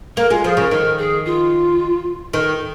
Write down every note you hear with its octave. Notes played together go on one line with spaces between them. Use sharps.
A#3 A#4
G#3 F4
F3 G#4
C#3 A#4
D#3 A#4
G#4
F4
D#3